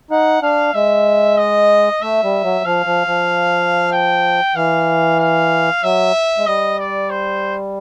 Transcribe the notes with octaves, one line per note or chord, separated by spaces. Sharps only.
D#4 F#5
D4 F5
G#3 E5
D#5
A3 E5
G3
F#3
F3 F5
F3
F3
G5
E3 F5
F5
F#3 E5
G#3
G3 D#5
D5
C5